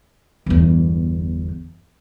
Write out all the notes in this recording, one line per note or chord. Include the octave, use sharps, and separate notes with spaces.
G1 E2